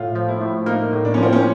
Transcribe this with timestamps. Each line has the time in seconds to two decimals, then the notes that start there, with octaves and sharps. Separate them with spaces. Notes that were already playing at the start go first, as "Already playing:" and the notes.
Already playing: A2 F4
0.15 F3
0.28 E4
0.41 A2
0.66 A#3 D#4
0.93 A2
1.05 D4
1.14 F3 C#4
1.23 C4
1.33 C#4